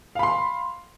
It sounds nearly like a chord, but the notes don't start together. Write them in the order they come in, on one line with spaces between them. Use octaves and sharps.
F5 B5 C6